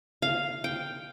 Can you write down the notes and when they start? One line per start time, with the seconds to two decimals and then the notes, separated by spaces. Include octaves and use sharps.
0.22 F5
0.64 G5